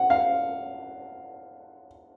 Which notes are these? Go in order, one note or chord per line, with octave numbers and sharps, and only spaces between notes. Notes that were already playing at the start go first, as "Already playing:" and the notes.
Already playing: F#5
F5